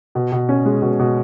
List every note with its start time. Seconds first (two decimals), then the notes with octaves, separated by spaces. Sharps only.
0.15 B2
0.32 B2
0.49 C#4
0.66 G#3
0.82 B2
0.99 B2